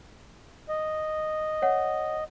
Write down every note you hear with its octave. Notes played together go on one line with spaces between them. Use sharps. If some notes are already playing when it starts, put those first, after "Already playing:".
D#5
C#5 F#5